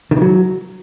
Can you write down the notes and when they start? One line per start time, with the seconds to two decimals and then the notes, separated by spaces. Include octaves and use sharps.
0.11 D#3
0.16 E3
0.22 F#3